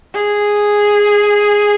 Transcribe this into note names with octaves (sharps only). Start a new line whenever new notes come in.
G#4